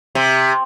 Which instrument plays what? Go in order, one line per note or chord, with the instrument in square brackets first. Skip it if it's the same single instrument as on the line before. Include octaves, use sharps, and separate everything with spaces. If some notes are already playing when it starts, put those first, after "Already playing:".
[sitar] C3